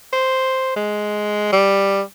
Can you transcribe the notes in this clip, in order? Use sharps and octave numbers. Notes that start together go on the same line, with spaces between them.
C5
G#3
G3